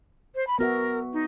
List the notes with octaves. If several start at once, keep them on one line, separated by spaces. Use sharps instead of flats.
C5
B5
B3 F#4 A#4 E5
D#4